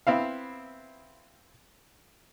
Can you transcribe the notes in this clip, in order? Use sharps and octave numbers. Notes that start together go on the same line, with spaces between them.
B3 C4 E4 F5